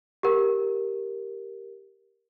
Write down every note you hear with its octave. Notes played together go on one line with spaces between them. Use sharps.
G4 A#4